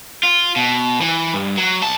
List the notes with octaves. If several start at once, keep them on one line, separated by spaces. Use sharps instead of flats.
F4
B2
E3
G2
F#3
B1 A5